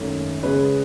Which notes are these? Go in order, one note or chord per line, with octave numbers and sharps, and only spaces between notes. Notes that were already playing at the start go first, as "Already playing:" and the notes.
Already playing: G#1 F#2 D#3 A3 C#4
C#3 G#3 C#4 G#4 B4